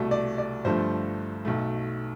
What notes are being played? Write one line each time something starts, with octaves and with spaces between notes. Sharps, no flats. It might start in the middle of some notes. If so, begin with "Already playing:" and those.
Already playing: C2 B2 A3
D5
D5
G1 G2 F3 A3 C5
B1 B2 A3